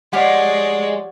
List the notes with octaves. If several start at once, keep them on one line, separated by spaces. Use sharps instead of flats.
F3 G#3 G4 C#5 D5 F#5